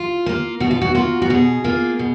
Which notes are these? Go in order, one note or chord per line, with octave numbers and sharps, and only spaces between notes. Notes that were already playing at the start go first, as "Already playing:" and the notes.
Already playing: F4
A#3 F4
B2 F#4
F4
F#4
A#3 F4 F#4
F#4
B2 G#4
A#3 F4
B2